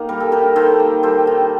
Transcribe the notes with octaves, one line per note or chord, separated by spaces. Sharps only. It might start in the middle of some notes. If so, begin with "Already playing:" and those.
Already playing: D#3 A#3
G3 A#4
A4
D#3 G4 A#4
D#3 A4 C5
A#3
G3 A4 C5
D#3